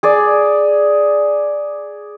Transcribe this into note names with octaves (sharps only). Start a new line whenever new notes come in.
G#4 D5